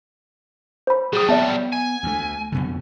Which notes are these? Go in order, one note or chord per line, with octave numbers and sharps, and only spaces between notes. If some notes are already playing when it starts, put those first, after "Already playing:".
C5 B5
F#3 G3 G#4 D#6
B3 D5 E5 A5
G#5
D2 A3
F2 B2 D3